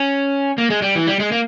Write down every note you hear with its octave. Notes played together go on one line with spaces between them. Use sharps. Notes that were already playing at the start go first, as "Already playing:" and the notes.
Already playing: C#4
A#3
G#3
G3
E3
G3
G#3
A#3